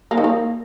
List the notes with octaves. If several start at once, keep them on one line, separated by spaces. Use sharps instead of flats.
A#3
D#3
A#3